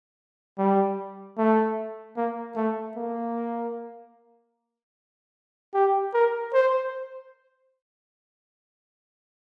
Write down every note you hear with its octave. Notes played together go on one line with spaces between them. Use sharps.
G3
A3
A#3
A3
A#3
G4
A#4
C5